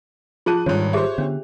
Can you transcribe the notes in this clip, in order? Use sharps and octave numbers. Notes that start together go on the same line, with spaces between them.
F3 F4 G#4 A5 F#6 D#7
G#1 G2 D#3 G3 C#5 C6
G4 G#4 C5 C#5 E5
D3 B3 C#4 D4